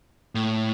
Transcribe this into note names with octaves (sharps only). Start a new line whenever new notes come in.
A2